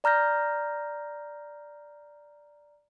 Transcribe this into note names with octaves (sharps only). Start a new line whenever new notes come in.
D5 A#5 F6 G6 A#6